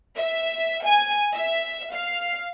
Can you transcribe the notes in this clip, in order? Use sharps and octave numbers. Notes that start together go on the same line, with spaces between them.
E5
G#5
E5
F5